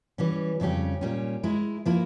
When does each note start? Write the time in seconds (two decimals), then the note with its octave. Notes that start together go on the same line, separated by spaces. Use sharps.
0.18 E3 G3 C#4
0.60 F2 C#3 G3 C#4 G4
1.01 A#2 G3 C#4
1.43 G#3 E4 A#4
1.86 F3 A#3 E4 A#4